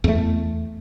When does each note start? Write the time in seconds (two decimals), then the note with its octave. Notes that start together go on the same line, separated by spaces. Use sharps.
0.04 E2 A3